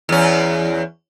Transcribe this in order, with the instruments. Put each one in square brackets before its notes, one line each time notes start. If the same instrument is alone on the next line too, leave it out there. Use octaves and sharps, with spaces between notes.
[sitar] E2 C#4